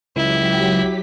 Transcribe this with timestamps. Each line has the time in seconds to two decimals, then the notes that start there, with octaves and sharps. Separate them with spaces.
0.16 C#2 F#3 E4 G4 B6